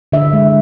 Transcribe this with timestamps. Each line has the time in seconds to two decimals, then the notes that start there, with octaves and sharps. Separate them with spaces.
0.12 D3 E5
0.33 G#3